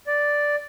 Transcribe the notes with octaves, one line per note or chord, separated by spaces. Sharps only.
D5